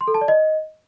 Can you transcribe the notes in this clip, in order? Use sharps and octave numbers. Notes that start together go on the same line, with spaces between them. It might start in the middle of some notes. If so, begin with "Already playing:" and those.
C6
A4
A5
D5
D#5